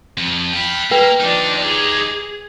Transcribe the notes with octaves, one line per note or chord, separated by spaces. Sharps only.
F2
F5 G5 B5
A#3 A#4 B4 G5
F3 D4 D#4 G4
G#4